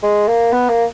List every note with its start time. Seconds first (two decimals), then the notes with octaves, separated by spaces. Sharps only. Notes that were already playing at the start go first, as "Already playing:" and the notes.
0.03 G#3
0.28 A#3
0.53 B3
0.70 A#3